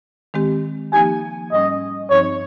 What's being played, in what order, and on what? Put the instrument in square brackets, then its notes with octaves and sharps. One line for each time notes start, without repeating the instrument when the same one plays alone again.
[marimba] D#3 G#3 C4 G4
[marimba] F3 A#3 D#4 G4 [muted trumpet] G#5
[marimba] G#2 G3 C#4 [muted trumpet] D#5
[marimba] G2 F3 C4 D#4 [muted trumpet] C#5